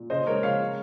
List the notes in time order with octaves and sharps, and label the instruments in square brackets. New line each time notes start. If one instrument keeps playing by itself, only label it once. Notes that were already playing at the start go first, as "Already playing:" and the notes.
Already playing: [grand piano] A#2
C#3 C5 D#5
G#3 A#4 C#5
C#3 C#5 F5
G#3